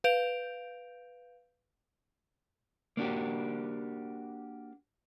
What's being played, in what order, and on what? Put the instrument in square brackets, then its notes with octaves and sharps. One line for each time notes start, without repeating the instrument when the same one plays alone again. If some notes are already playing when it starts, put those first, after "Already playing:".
[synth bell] B4 F5 G6 D7 F7
[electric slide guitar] A#3 D4 F#4 G4